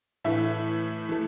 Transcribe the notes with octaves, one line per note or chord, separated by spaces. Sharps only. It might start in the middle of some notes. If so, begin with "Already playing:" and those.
A2 E3 A3 E5
E3 A3